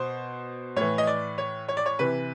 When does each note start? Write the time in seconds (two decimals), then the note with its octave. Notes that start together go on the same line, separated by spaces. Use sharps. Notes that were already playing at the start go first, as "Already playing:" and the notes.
Already playing: B2 C5
0.76 A2 E3 C#5
0.98 D#5
1.07 D5
1.38 C#5
1.68 C#5
1.77 D5
1.86 C#5
1.99 C3 E3 B4